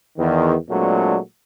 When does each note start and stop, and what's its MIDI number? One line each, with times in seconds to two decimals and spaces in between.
0.18 0.54 40
0.18 0.54 51
0.70 1.18 46
0.70 1.18 54
0.70 1.18 56
0.70 1.18 57
0.70 1.18 60
0.70 1.18 62